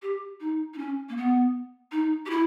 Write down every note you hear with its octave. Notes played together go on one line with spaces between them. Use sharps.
G4
D#4
D#4
C#4
A#3
B3
D#4
G4
E4